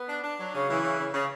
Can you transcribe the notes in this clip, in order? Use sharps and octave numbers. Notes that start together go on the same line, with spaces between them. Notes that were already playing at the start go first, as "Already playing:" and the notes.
Already playing: B3
D4
D4
F#3
C#3
E3
C#3
C#3
C#3